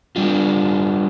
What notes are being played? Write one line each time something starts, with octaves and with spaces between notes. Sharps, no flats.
G3 D4 F4